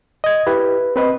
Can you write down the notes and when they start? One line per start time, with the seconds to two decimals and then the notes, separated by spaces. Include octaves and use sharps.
0.24 D#5 G#6
0.47 E4 G4 B4
0.96 C4 B4 D#5